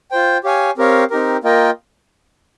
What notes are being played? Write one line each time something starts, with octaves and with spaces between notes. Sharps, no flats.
F4 C5 G5
G4 C#5 F5 G#5
C4 G4 A#4 C#5 F5
C4 D#4 G4 A#4
A#3 F4 A#4 D#5 G5